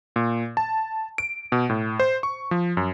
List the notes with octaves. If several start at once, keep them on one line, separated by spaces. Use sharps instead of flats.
A#2
A5
D7
B2
A2
C5
C#6
F3
F#2